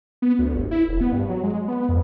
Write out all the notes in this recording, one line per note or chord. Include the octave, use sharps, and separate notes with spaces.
B3
D2
G1
E4
E1
B3
G2
F#3
G#3
B3
F2